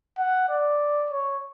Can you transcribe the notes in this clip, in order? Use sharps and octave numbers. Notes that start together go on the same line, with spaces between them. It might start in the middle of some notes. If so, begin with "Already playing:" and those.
F#5
D5
C#5